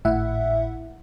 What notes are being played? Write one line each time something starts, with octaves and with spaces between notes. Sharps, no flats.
G#1 A2 E4 E5 F#5